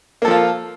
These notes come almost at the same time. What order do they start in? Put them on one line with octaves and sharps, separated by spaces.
A#3 A4 F3 F4